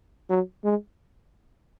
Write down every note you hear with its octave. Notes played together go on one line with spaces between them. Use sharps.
F#3
G#3